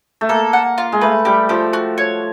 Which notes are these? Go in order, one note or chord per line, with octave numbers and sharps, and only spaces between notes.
A3
A#3 A4
F#5
F4
G#3
A3 B4
G3 G4
F3 G4
F#4
C#5